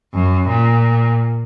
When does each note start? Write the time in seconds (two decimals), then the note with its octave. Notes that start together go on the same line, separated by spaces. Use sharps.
0.14 F#2
0.49 A#2